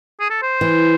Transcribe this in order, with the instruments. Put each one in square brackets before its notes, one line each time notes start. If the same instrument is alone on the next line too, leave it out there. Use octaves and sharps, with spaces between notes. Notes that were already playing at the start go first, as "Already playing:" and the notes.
[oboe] G#4
A4
C5
[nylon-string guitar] E3